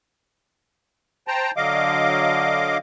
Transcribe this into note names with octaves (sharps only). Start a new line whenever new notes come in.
C5 G5 A5 A#5
D3 F#3 D#5 F5 D6